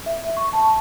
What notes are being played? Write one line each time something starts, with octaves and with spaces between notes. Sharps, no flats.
E5
C#6
A5